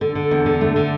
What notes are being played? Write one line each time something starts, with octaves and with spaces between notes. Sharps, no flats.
D3 A4
D3
E2
D3
A3
D3